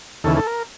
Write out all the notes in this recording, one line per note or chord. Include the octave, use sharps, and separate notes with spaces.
D#2 C#3 E3 A4
A4
A#4